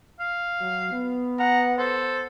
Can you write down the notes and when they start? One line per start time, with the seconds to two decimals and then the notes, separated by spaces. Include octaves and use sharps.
0.20 F5
0.59 F#3
0.91 B3
1.39 F#5 A#5
1.78 A4 C5